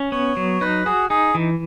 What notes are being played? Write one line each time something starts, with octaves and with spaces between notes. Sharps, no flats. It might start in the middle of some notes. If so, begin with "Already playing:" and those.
Already playing: C#4
B3 C#5
F#3
D#4 B4
F#4 G#4
D#4 G#4
E3